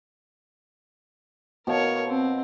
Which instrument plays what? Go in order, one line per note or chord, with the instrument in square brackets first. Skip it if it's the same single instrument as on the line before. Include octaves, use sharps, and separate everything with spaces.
[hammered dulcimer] B2 F5 A5 [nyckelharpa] A#4 C#5
[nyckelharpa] C4